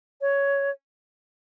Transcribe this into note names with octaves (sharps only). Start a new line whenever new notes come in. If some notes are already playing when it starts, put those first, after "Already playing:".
C#5